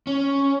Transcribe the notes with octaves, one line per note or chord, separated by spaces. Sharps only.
C#4